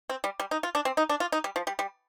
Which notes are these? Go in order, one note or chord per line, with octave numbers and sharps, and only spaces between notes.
C4
G3
G3
D#4
F4
D4
C4
D#4
D4
F4
D#4
G3
F3
G3
G3